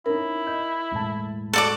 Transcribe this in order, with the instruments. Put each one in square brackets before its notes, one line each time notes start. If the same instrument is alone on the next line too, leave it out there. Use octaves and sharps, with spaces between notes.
[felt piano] C#4 D#4 [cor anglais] E4 [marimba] A#4
[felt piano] D#5 G6
E1 A2 A5
[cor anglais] F#4 [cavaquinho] A4 D5 D6